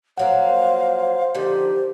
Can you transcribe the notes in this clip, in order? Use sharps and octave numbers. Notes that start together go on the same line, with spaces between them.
F3 F#3 A#3 C5 F5 F#5
D3 D#3 F3 G4